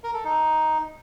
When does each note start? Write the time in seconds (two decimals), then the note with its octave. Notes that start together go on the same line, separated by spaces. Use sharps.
0.03 A#4
0.14 A4
0.24 D#4